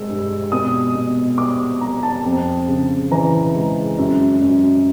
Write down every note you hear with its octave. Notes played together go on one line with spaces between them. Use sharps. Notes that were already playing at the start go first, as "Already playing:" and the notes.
Already playing: G#3 E6
G2
B2 D#6
B2
G3 D6
G3 A#5
A5
F2
C#3
E3 A#5
G#3
F#2
F#2